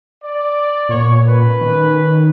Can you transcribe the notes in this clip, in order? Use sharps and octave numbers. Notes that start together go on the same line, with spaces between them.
D5
A#2 B3 C#5 C#6
C#4 B4
D#3